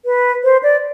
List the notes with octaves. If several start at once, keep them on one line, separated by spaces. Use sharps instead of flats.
B4
C5
D5